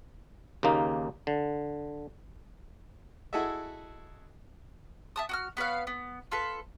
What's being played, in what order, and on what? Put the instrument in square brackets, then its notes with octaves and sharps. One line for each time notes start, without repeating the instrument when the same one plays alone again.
[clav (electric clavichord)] D#2 C#3 A#3 D#4
D3
[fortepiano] E4 F#4 G#4 A4 D#5 E5
[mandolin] E5 A5 D#6
F#4 D#6 F6
B3 B4 C#5 F5
B3
F4 A4 B4